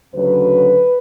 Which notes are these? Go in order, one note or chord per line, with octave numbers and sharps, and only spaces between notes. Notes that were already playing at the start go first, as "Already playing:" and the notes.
D2 C#3 F#3 B4